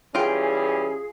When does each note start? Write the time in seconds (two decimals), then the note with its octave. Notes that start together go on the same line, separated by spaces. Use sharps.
0.15 E3 G3 C#4 F4 G#4 G5